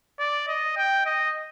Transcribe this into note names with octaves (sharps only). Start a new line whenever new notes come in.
D5
D#5
G5
D#5